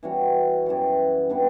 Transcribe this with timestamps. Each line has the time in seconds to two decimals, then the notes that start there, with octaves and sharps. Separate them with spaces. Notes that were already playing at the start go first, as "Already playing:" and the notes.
0.03 E3 G3 C#4 F#4
0.66 F#2 E3 G3
1.30 E3 G3 B3 D4